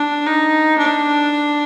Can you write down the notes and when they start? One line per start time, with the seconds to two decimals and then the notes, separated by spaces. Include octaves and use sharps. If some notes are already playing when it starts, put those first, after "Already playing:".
Already playing: D4
0.27 D#4
0.78 D4